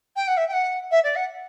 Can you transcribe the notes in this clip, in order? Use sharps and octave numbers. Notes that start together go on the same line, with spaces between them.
G5
F#5
E5
G5
F#5
E5
D5
F#5